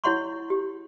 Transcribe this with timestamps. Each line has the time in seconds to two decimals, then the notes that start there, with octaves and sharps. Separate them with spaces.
0.04 E4 C#5 F#5 C6 C#6
0.50 G4